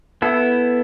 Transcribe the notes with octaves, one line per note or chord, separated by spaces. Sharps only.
B3 E4 A4